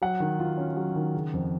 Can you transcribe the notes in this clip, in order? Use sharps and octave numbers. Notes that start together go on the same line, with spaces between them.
F#3 F#5
D#3
F4
C#4
F#3
D#3
C#3
F2